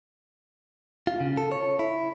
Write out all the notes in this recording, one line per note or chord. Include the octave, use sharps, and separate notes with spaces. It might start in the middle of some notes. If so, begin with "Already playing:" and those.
F4
C#3
A4
C#5
E4